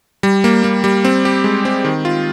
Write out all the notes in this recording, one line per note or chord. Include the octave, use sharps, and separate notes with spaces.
G3
A#3
A#3
G3
C4
G4
G#3
C4
D#3
F4